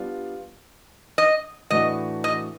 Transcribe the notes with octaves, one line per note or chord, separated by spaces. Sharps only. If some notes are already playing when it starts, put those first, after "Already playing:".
Already playing: G3 B3 D4 F4
D#5
A2 E3 A3 D4 F#4 D#5
D#5